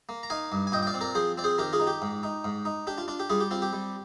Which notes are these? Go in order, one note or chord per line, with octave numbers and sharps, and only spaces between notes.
A#3
A#5
D#4 F5 G#5
G2
G#5
A#2 D#5 G5
G5
D5 F5
C4
A#4 D5
F3 G#4 C5
C4 D5
G#4 C5
D#3 G4 A#4
F4 G#4
D#4
G4
G#2
D#4
G#2
D#4
D4 G4
F4
D4 F4
G4
G3 F4 G#4
G4
C4 F4
G4
G3